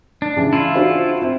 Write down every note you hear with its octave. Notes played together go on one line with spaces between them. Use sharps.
D4
C#3 E3
E4 F4
D4 F#4 C5
C4 E5